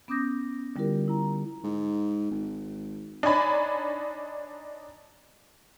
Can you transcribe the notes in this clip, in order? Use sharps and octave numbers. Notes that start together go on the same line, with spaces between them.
B3 C#4 D6 D#6 G6 A#6
D3 G3 E4 F4 G4 A#4
E4 A#5
G#2
G#1
D4 D#4 C#5 G#5 B5